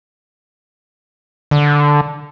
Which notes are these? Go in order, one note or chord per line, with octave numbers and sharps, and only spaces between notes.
D3